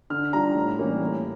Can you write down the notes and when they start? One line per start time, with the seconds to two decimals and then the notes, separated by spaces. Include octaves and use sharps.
0.10 D3 F6
0.33 G3 D4 F4 A#5
0.55 A2
0.78 E3 G3 A#3 C#4
1.01 A2